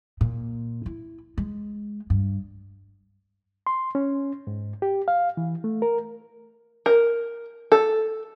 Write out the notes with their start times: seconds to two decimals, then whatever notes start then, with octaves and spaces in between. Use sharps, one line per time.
0.21 A#2
0.86 E4
1.38 G#3
2.10 G2
3.67 C6
3.95 C#4
4.47 G#2
4.82 G4
5.08 F5
5.37 E3
5.64 A3
5.82 A#4
6.86 A#4
7.72 A4